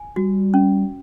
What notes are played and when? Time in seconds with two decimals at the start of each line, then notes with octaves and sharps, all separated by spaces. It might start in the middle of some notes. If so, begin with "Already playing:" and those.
Already playing: G#5
0.16 G3 F#4
0.54 C#4